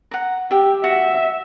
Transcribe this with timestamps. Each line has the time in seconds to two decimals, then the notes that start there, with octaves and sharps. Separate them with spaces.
0.11 F#5 A#5
0.51 G4 E5 G5
0.84 F#4 E5